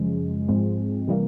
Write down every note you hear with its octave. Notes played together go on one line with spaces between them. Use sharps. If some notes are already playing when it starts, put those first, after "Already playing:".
Already playing: F#2 C#3 F3 G#3
G#2 F3 G#3 C4
C3 E3 G3 A#3